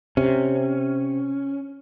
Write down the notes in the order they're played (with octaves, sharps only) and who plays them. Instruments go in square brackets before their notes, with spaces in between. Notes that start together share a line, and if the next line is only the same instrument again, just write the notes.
[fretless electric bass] C3 [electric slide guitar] C#4